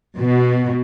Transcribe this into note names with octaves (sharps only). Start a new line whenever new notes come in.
B2